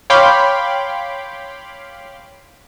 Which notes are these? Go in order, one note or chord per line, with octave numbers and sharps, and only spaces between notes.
C#5 F5 G5 B5 C6 D6